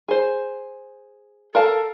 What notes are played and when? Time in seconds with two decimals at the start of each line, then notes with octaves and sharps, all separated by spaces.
0.08 G#4 C5
1.55 A4 A#4 F5 A5